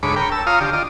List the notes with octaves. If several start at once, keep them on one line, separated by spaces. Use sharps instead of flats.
D2 G#2 C#5 B5 D6
A#4 C#5 G5 B5
A5 E6
F4 C#5 F5 A#5 D#6
D3 G4
F4 D5 D#5